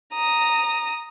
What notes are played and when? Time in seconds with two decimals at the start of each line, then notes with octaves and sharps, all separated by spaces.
0.14 A#5 D#6